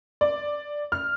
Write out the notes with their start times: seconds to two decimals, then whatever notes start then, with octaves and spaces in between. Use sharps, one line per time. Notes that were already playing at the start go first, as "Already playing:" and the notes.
0.21 D5
0.92 F6